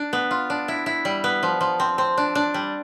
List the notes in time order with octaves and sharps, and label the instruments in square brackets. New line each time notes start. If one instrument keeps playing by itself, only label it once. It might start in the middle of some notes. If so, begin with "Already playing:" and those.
Already playing: [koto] D4
B3
F4
D4
E4
E4
G3
B3
F3
F3
C4
C4
D4
D4
G3